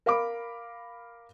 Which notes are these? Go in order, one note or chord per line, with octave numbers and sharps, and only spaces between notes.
A#4 F5 B5 D6